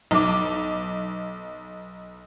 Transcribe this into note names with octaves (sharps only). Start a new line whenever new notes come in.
B1 D6